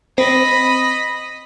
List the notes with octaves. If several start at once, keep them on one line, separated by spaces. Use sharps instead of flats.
C4 D#5 B5